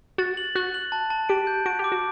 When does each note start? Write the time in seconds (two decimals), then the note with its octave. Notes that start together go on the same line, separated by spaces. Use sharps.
0.18 F#4 A6
0.37 F#7
0.55 F#4 F#6
0.74 F#7
0.92 A5
1.10 A5
1.29 G4 D7
1.47 G6
1.66 F#4 D7
1.79 G4
1.84 D6
1.92 F#4